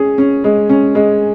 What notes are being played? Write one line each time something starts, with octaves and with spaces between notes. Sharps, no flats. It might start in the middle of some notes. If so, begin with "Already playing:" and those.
Already playing: C#4 G#4
C#4
G#3
C#4
G#3